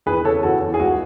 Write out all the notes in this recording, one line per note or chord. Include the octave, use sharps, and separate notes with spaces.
E2 G#4 B4
C#3 A4 C#5
E2 F#4 A4
E2
G#4
C#2 F#4